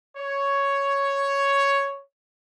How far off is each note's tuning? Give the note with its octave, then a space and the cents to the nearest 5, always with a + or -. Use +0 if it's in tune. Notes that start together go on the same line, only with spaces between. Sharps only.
C#5 +5